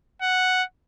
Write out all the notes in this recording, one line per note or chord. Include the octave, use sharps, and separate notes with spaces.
F#5